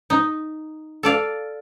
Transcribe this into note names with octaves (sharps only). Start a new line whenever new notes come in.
D#4
A4 D5 F5